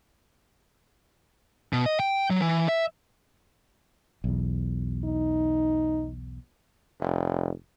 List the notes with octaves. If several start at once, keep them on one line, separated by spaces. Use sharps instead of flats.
B2
D#5
G5
F#3
E3
E5
B1 E2
D#4
F1